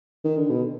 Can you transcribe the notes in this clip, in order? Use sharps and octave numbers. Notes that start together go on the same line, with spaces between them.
D#3
D3
B2